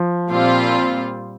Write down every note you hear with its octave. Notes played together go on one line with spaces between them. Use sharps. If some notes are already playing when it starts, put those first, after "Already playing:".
Already playing: F3
A#2 G3 C4 F4